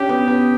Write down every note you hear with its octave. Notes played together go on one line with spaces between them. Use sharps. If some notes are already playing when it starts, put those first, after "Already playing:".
Already playing: C#4 D4 G4
B3
B3